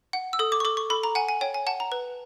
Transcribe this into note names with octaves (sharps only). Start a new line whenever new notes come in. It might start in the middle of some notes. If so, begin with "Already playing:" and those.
F#5
E6
A4 D#6
D6
C#6
A4 D6
C#6
A4 B5
A#5
F#5 G#5
G#5
C#5 G5
G#5
F#5 A5
A#5
B4